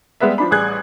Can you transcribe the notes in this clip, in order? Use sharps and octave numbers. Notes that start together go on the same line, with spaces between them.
G3 G#3 B3 B4 E5
F3 D4 B5
A1 G3 G#4 F#6 G#6